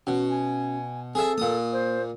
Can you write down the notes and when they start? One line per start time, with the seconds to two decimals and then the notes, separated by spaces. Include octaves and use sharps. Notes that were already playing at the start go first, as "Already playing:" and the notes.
0.07 B2 C#4 F#4
0.30 G#5
1.15 C4 G#4 A4 E5
1.38 A#2 A#3 D#6
1.73 C5